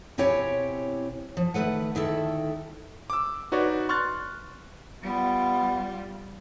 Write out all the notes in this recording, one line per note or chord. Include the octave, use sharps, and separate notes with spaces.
B2 C4 E4 G4 C#5 G#5
F3
D#3 F#3 A3 B4 F#5
D2 D#3 E4 A4
D6 E6
D#4 F#4 B4 C#5 D5
C6 C#6 F6 F#6 A6
G3 B3 F4